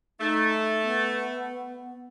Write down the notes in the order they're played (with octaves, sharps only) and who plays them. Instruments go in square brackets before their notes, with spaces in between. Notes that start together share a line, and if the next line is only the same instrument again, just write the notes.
[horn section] A3 [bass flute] D#4
[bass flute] B3